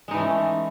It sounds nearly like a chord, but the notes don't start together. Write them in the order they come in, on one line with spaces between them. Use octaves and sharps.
G#3 D#4 E3 A3 C#4